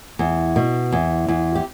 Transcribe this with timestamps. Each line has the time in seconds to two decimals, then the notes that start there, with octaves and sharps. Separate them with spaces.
0.19 E2
0.56 B2
0.92 E2
1.28 E2
1.55 G4